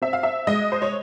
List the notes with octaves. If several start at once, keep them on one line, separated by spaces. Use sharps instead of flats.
C4 E5
F5
E5
G#3 D#5
C5
C#5